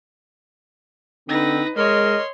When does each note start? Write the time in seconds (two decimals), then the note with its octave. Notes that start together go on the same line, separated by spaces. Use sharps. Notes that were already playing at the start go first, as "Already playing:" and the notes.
1.29 D3 C4 D#4 B4 A#6
1.77 G#3 A#4 C#5 D#5 C6